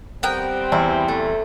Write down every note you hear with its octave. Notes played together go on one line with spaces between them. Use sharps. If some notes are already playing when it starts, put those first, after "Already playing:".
G3 B3 C4 A#4 G5
E2 E4
A3